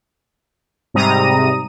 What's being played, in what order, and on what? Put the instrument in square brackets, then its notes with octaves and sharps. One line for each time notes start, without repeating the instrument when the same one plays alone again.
[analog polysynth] G#2 C3 G3 A#5 D#6 D#7